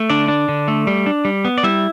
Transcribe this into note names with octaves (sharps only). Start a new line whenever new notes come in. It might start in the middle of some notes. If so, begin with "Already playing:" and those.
Already playing: A3
D3 D4 D5
D4
D3
A3
G3
D4
G3
B3
D5
G3 E4 E5